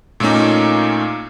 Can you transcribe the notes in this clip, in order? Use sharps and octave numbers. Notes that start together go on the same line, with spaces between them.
A#2 A3 A#3 C#4 D#4